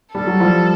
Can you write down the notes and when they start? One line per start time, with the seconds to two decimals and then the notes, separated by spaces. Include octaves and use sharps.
0.15 G3 A4
0.27 F#3
0.40 F3 G3